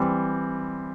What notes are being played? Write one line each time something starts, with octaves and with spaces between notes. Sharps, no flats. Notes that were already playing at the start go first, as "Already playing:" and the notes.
Already playing: E3 G3 C4